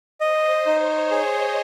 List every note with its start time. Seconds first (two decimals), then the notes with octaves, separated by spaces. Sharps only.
0.20 C5 D#5
0.66 D#4 C#5
1.11 G#4 D#5